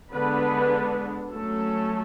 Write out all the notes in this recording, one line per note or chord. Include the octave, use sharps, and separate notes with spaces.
D3 G#3 B3 D4 B4
F#3 A3 C#4 A4